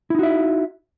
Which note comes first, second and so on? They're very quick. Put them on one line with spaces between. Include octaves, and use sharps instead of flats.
E4 D#4 F#4 E5